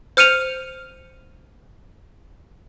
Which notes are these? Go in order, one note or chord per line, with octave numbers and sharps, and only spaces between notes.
C5 F6 C#7 D#7 F7